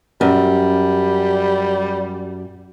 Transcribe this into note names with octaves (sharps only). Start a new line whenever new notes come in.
F#2 G3